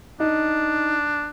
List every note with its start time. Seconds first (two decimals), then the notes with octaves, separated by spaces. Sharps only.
0.20 D4 D#4